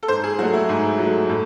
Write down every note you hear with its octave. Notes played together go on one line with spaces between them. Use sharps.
A4
G#2 C5
G#4
F#3 A3 F#4
E4
G#2
F#3 A3
A2